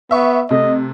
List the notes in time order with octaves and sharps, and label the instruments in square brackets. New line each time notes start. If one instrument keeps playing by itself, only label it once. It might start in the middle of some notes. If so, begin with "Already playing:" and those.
[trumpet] B3 [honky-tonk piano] E5 C#6
[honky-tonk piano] C3 A3 [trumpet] D#5